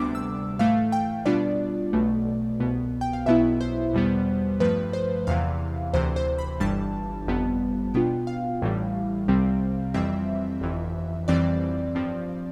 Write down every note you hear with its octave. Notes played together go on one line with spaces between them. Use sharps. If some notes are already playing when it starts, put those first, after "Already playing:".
Already playing: D2 C3 G3 B3 D4 D6
E6
A2 E3 A3 F5
G5
B2 G3 B3 D4 F4 D5
B1 B2 A3
C2 B2 B3
G5
F5
B1 B2 B3 E4 E5
C5
E2 B2 G3 B3
G2 F3 A3 B4
C5
E2 C3 E3 F5
D2 C3 E3 C5
C5
B5
G1 G2 E3 G3 D4 A5
G1 F2 C3 G3 B3
B2 B3 D4 F4 G5
F5
A1 A2 E3 G3
C2 C3 G3 C4
F2 E3 G3 C4 E5
G1 F2 E3
F2 E3 G3 C4 D5
G2 F3 C4